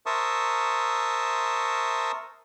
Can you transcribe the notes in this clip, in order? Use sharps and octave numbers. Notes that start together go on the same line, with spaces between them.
A#4 C5 E5 A5 C#6 D#6